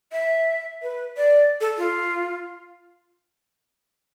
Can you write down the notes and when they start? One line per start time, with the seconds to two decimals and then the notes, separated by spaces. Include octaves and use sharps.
0.12 E5
0.82 B4
1.17 D5
1.61 A4
1.78 F4